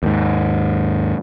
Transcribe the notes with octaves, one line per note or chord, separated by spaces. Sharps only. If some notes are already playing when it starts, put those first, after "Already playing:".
D#2 G#2